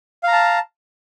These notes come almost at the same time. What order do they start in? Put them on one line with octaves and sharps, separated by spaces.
F5 A#5 A5